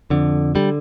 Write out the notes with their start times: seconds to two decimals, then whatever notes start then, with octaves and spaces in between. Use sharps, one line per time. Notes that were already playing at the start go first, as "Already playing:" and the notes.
0.10 F2 D3
0.55 D3 G3